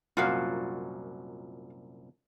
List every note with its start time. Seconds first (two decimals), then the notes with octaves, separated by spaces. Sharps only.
0.17 C2 F#2 A#2 F4 F#4 F5